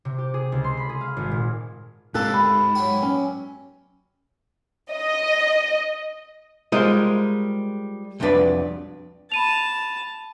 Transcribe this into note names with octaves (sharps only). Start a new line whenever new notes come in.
C3
G4
G#4
C#2
C6
B5
G#4
F5
G#1
A#2
G#2 C3 G3 A#3 G4 A4 F#6
D2 B5
F#3 E4 G4
C#4
D#5
G3 G#3 F4 A#4 C5 D#5
C2 F2 F#3 D4 B4 D5
A5 B5 D#7 F7